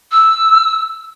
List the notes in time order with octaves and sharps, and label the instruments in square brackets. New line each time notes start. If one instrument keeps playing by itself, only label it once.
[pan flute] E6